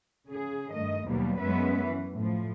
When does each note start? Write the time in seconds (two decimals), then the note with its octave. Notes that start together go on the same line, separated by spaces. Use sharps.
0.28 C#3 G#4
0.70 G2 D#3 A3 D#5
1.06 D#2 B2 F#3 G3 A#3
1.38 F#2 G#3 B3 C#4 B4 E5
1.84 E3
2.14 A2 F3